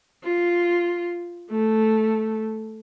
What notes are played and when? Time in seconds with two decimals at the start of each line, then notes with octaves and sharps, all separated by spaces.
0.24 F4
1.51 A3